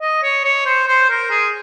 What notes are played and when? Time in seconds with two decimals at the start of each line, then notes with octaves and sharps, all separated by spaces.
0.01 D#5
0.23 C#5
0.44 C#5
0.66 C5
0.88 C5
1.10 A#4
1.30 G#4